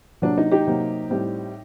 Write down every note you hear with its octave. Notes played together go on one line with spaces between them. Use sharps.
C3 F#3 A#3 D4
D#4
D#4 G4
C3 F#3 A#3
A2 G3 C4